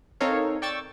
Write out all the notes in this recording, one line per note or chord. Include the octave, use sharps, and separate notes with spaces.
C4 D#4 A4 A#4 C#5 F5
D5 G5 C#6 E6 A6